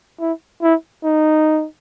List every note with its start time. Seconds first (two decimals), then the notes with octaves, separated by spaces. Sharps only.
0.20 E4
0.62 E4
1.04 D#4